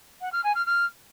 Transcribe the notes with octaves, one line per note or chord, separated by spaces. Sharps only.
F#5
F6
G#5
F6
F6